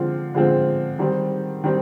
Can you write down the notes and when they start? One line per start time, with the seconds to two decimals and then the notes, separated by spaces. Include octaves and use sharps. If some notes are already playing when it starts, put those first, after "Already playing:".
Already playing: D3 F3 G#3 C4 F4
0.35 D3 F3 G#3 C4 F4
0.99 D#3 G3 C4
1.64 D#3 G3 C4